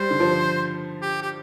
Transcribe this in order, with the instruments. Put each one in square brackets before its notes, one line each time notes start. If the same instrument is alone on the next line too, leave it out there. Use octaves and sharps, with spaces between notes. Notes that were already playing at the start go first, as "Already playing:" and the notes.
Already playing: [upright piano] G3 [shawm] C5
[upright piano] D3
F3
[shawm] G4
G4